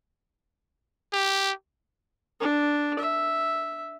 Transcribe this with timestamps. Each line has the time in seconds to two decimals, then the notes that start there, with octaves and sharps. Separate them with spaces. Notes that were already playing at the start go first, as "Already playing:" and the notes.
1.13 G4
2.40 D4
2.99 E5